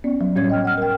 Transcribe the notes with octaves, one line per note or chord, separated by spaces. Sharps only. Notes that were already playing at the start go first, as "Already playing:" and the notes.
B3 C#4 D5
F#3
A2 G3 C#4 C#5 G#6
D#5 G5 F6
F#5 F6
A#4 G5